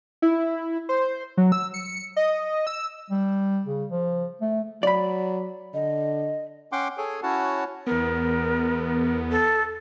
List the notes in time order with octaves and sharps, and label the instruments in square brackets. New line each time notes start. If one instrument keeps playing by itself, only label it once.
[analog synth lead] E4
C5
F#3
E6
C#7
D#5
E6
[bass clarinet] G3
C#3
F3
A3
[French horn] F#3 [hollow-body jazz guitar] D5 B5
[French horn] D3 [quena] D#5
[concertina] C#4 F#5 G5 C6 D6
G#4 A4 C#5 G#5
C#4 E4 F#4 C#5 F#5 A5
[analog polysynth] E2 B3 [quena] A#4
[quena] A4